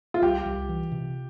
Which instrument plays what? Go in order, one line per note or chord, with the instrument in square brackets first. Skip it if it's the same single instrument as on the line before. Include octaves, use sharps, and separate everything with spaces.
[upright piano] F4
[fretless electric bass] C2 [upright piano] G4
[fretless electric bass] C2
E3
C3